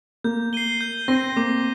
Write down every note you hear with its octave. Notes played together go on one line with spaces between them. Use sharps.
A#3 G6
C7 D#7 G7
G6
C4 A#6 D#7
A#3 D6